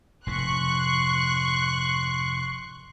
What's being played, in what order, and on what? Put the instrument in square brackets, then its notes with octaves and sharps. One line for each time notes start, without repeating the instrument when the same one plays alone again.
[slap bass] F1 G#2 [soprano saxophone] C6 [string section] C#6 F#6